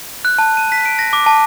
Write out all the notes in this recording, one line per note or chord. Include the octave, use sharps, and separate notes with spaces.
F#6
A5
D#7
B6
D7
A#6
D6
A5